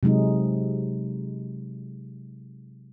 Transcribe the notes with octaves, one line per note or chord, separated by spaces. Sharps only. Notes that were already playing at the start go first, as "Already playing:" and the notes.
C3 F#3 G#3 D#4